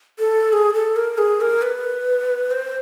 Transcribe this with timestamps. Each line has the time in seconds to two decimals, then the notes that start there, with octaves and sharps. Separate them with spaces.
0.19 A4
0.53 G#4
0.74 A4
0.96 A#4
1.18 G#4
1.41 A#4
1.62 B4
2.51 C5